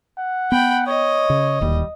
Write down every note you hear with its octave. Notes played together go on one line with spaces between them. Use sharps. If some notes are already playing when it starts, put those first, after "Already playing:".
F#5
B3 G5 B5
C#5 D#5
C#3
D1 D#2 G3